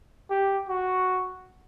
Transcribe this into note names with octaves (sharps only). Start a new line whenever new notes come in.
G4
F#4